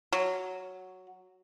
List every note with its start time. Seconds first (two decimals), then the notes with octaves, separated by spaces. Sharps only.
0.12 F#3